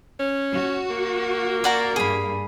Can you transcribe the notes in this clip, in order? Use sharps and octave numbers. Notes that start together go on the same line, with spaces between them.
C#4
F#4
A#3
F#4 D5 F#5 A#5
G2 G#4 B5